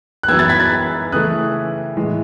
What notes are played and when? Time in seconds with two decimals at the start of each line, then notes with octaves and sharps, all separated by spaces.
0.23 F#6
0.28 F#2 E3 B3 E6 G#6
0.39 F#6 A6
0.49 G#6 B6
0.60 F#6 A6
1.12 C#3 E3 A3 D#6 F#6
1.97 A2 E3 G#3